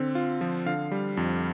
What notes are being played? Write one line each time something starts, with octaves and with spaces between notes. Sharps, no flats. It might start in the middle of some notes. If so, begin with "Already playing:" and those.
Already playing: D3 C4
F4
F3
D3 F5
G3
F2